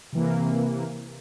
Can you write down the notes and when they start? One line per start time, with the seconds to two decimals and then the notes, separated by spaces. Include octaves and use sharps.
0.13 C3 E3 A#3